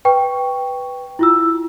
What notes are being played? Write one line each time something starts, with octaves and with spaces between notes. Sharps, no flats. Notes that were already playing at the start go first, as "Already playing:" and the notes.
B4 G5 C#6
E4 F4 E6